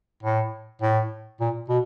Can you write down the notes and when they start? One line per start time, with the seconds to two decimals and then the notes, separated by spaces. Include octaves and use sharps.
0.23 A2
0.82 A2
1.41 A#2
1.69 B2